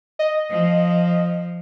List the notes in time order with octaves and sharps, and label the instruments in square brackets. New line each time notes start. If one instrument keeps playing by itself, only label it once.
[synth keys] D#5
[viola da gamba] F3